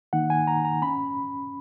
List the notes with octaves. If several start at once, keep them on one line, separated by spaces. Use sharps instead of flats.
D#3 A#3 D#4 F#5
G#5
A#5
A#5
C#4 B5